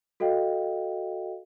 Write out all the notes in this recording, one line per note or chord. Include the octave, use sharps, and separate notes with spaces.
F#4 A4 D#5 F5 G5